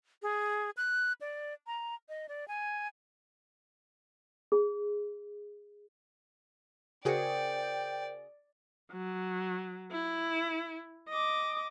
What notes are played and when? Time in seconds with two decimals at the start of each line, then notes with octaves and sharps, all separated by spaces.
0.22 G#4
0.77 F#6
1.21 D5
1.67 A#5
2.09 D#5
2.29 D5
2.48 G#5
4.52 G#4
7.05 C#3 F#4 G#4 A#4 C5 D5 G5 C#7
8.92 F#3
9.92 E4
11.09 D#5 D6